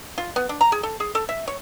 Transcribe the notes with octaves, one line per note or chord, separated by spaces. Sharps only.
F4
B3
D4
A#5
G#4
A4
G#4
A4
E5
C#5